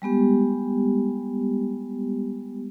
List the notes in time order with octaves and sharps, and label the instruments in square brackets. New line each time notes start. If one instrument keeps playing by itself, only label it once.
[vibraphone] G3 G#3 B3 G4